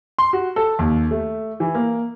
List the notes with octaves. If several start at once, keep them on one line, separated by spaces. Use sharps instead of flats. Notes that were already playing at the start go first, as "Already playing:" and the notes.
C6
F#4
A4
D#2
A3
E3
A#3